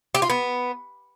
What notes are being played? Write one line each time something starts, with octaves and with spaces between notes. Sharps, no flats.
G4
F4
B3